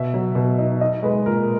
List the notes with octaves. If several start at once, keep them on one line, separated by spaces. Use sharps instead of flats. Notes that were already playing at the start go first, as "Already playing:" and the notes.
Already playing: B2 E5
F#3
B2
D#4
D#4 D#5
G#3 B4
A#2 A#4